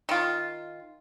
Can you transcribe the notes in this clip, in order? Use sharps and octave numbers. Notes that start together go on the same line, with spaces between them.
D#3 F4